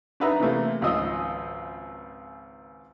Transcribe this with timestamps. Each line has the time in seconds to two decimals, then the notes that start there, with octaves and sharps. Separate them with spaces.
0.20 D4 D#4 B4 E5 A#5
0.40 C3 E3 A3 A#3
0.81 G#1 C#2 F3 F4 D#5 E6